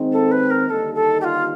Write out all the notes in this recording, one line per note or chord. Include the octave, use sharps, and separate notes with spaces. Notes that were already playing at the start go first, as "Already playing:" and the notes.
Already playing: D#3 G#3 C4 D#4
A4
B4
A#4
D#2 D3 G3 A#3 D#4 A4
A4
G4
F4